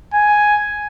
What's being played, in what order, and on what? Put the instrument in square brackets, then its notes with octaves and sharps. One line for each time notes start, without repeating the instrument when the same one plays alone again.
[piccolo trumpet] G#5